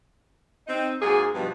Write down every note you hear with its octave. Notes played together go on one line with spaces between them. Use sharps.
C4 D#4
G#2 F#3 A#3 G#4
G2 B2 F3 B3 G4